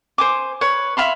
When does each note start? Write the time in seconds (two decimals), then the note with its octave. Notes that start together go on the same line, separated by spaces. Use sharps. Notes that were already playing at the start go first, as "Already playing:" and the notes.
0.18 C5 G#5 D6
0.61 B4 C#5
0.97 E5 F5 B5 C6